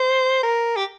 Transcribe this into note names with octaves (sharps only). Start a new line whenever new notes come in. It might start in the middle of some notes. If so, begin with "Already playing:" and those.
Already playing: C5
A#4
G4